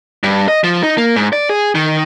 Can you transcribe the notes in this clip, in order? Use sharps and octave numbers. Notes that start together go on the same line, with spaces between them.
G2
D#5
F3
D#4
A#3
G#2
D5
G#4
D#3